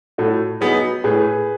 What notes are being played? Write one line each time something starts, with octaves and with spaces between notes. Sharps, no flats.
A2 F#4 A4
F#3 B3 D#4 G#4 B4
A2 G#4 B4